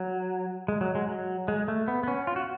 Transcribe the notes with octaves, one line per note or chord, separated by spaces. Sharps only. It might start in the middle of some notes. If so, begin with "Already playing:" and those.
Already playing: F#3
G#3
F#3
G#3
F#3
G#3
A3
B3
B3
C#4
F4
F#4